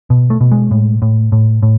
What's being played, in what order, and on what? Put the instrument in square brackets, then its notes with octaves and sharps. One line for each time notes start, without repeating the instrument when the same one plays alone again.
[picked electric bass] B2
A3
B2
G#3
A2
A2
A2
A2